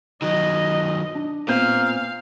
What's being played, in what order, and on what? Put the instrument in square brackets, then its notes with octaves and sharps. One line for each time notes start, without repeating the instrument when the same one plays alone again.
[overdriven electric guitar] D#3 F#3 [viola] D#5
[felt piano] D4
[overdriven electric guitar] A#2 [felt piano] B3 C4 G6 [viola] F5